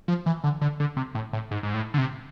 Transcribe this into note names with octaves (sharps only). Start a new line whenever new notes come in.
F3
E3
D3
D3
D3
C3
A2
A2
G#2
G#2
A2
D3
C3